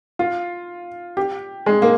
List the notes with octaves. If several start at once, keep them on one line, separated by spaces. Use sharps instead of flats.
F4
G4
G#3
A#3